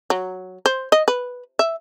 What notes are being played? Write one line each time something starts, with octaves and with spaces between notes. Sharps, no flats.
F#3
C5
D#5
B4
E5